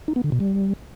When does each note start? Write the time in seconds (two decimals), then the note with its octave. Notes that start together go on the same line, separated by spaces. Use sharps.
0.08 D#4
0.16 B3
0.24 D3
0.32 B2
0.40 G3